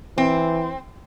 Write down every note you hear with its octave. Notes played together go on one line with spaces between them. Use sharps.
E3 C4